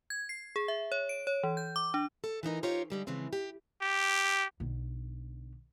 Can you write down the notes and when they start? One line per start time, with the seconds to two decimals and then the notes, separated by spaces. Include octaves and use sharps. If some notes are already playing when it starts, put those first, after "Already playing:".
0.10 G#6
0.29 C7
0.56 G#4
0.68 E5
0.92 C#5
1.09 D7
1.27 C#5
1.43 E3
1.57 G6
1.76 D6
1.94 D4
2.24 A4
2.43 E3 A#3 D#4 A#4
2.63 D#4 F4 G4 C5 C#5
2.90 D3 G3 G#3
3.07 C#3 E3 F3 G#3 C4
3.33 G4
3.81 G4
4.60 B1 D3